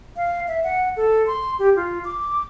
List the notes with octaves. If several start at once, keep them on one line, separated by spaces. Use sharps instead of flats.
F5
E5
F#5
A4
C6
G4
F4
D6